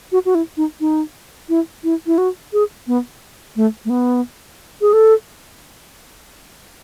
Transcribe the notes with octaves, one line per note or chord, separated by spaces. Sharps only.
F#4
F#4
E4
D#4
D#4
E4
E4
E4
F#4
G#4
B3
A3
A3
B3
G#4
A4